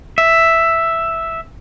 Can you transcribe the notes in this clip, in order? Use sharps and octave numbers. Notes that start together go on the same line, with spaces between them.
E5